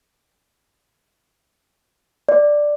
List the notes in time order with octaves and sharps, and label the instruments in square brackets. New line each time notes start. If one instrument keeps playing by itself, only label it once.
[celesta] D5